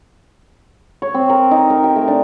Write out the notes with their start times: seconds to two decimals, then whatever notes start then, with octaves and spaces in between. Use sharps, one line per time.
1.02 C#5
1.14 C4
1.30 A#4
1.51 D#4
1.70 A#4
1.84 G4
1.96 A3
2.08 D4